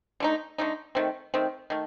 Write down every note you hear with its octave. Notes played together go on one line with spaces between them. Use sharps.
D3 A3 D#4
D3 A3 D#4
D#3 A3 C4
D#3 A3 C4
D#3 A3